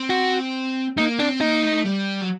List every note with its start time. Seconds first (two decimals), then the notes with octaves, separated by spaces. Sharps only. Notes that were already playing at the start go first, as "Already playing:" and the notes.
Already playing: C4
0.10 F#4
0.97 A#3 D#4
1.19 C4 D4
1.41 A#3 D#4
1.63 A3
1.85 G3
2.21 F#3